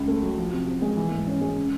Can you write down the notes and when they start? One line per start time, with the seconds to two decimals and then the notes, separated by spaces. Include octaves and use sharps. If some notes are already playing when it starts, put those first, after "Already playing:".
Already playing: C#2 C#3
0.08 A3
0.23 F#3
0.37 F3
0.53 C3
0.67 C3
0.82 G#3
0.97 E3
1.11 G#2
1.27 C#4
1.41 G#3
1.56 C#3